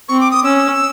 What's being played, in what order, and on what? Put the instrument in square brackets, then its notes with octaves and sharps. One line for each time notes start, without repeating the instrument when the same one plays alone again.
[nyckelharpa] C4 [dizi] C#6
[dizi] D6
D#6
[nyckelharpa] C#4 [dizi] E6